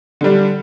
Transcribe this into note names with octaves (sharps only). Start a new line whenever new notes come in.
D3 G3 D4